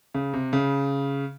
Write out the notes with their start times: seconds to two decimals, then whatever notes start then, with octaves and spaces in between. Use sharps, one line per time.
0.14 C#3
0.33 C3
0.53 C#3